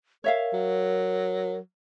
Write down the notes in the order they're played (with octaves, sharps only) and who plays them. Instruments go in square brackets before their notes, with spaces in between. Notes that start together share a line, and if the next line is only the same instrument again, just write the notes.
[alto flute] A#4 [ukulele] C#5 E5 F5
[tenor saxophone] F#3